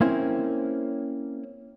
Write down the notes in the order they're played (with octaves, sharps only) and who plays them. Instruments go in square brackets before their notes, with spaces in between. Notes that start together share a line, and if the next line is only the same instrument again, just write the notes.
[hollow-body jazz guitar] A#3 C4 C#4 E4 C5